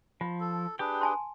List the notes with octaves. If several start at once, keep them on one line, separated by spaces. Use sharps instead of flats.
F3 F4
A4
D4 G4 G#4 B4 G5
G#5 A5 C6